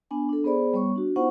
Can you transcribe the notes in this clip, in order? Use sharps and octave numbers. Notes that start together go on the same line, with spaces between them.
B3 D4 G#5
D4 A4
B3 G#4 C5 D5 B5
G3 B3 C#5 C#6
D4 F#4
B3 D#4 F4 C5 F#5 C#6